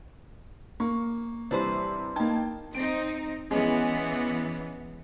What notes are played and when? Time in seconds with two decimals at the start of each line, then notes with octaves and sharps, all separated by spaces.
0.80 A#3 C#6
1.51 C3 E3 G3 D4 B4 C5
2.16 A#3 D#4 G5 A5 G#6
2.75 C4 D#4 D7
3.51 E3 G#3 B3 C#4 G#4